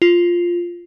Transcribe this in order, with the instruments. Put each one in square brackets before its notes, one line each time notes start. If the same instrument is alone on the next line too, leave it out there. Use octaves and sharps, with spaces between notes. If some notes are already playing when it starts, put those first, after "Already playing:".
[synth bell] F4